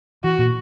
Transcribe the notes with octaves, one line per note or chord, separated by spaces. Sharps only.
E3 F#4
A#2